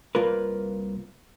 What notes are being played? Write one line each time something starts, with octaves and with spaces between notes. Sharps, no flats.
C2 A#3 F4 A#4 B4